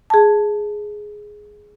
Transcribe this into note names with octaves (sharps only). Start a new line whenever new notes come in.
G#4 A5